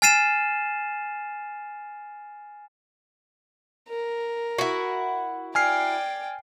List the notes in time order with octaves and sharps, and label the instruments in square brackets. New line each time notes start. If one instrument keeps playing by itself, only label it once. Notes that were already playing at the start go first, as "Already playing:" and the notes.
[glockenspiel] G#5 F6 A6 C7 D#7 E7
[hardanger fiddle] A#4
[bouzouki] E4 F#4
[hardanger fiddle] D5 G5 [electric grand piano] G#5 F6 C7